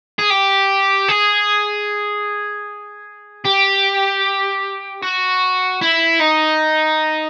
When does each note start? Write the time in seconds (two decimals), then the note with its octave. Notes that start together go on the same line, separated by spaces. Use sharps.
0.19 G#4
0.31 G4
1.09 G#4
3.45 G4
5.02 F#4
5.82 E4
6.20 D#4